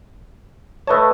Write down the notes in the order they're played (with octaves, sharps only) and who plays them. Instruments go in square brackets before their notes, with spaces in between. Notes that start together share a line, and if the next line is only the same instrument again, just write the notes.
[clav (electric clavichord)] A3 D#5 A5 [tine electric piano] B4 C#5